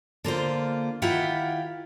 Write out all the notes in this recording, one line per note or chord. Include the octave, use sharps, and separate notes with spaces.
D3 A#3 F4 C5
D#3 E4 F4 G4 E5 F#5